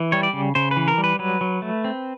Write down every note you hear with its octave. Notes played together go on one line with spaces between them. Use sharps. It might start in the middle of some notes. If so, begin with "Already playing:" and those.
Already playing: E3
G3 C#5
D5
C#3
C#3 C5
B4
E3
A#4
G3
B4
F#3 B4
F#3
A3
C4